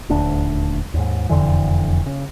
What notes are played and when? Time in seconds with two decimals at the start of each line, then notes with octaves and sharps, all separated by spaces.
0.09 D#1 D2 D4
0.94 D#2 G#2
1.29 E1 F2 D3 E3
2.06 C#3